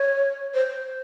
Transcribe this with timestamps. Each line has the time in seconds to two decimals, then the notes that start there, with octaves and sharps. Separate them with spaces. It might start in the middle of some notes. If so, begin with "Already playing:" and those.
Already playing: C#5
0.54 C5